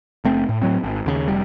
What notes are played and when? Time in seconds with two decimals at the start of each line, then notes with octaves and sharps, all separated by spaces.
0.25 F#1 A3 C4
0.49 A2
0.62 A2 F#3 C4
0.84 G#1
1.06 D#2 C#3
1.28 F1 G3